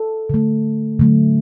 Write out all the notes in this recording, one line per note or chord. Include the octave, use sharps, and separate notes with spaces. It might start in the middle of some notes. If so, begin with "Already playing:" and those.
Already playing: A4
D3 A3
D3 F#3 A3